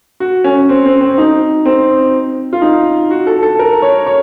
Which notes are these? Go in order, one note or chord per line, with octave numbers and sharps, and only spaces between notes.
F#4
C#4
C4
C4
C4
D#4
C4
F4
D#4
F#4
A4
A4
A#4
C#5
C#5